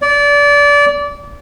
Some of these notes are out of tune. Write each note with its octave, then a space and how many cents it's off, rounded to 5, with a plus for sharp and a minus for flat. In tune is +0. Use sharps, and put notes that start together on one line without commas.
D5 -25